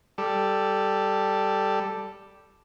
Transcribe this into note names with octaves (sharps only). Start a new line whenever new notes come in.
G3 A4